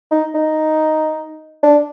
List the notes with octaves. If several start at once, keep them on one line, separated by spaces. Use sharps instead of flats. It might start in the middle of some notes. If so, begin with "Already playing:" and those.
D#4
D#4
D4